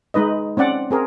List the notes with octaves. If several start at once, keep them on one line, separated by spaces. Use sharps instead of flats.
G#3 D#4 B4 D#5
C4 C#4 D5 F#5
C4 G#4 A#4